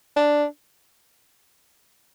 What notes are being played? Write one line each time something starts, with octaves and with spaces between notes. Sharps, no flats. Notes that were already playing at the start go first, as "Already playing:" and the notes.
D4